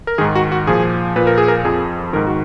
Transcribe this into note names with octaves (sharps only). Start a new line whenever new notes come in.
A#4
G#2 D#3 G#4
F#4
F#4
A#2 F3 G#4
A#2 F3 B4
A#4
G#4
A#4
F2 F3 G#4
G#2 D#3 A#4
F#4